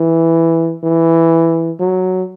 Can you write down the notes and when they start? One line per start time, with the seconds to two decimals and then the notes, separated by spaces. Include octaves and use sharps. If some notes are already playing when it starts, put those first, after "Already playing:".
Already playing: E3
0.84 E3
1.80 F#3